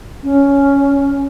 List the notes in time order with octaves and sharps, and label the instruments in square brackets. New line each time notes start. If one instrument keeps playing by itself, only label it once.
[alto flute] C#4